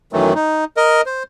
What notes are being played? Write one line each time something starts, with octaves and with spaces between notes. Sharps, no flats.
F#2 D#3 E3 F#3 A3
D#4
A#4 D#5
C5